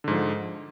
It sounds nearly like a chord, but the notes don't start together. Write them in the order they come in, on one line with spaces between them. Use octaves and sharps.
D3 G#2 F3